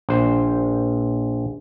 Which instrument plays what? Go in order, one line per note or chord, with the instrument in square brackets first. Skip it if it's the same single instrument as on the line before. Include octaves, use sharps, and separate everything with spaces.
[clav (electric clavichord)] A#1 C5